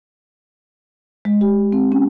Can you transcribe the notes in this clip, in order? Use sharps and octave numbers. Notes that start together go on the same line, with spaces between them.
G#3
G4
C4
C#4